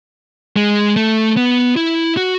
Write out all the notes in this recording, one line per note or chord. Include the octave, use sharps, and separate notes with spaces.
G#3
A3
B3
E4
F#4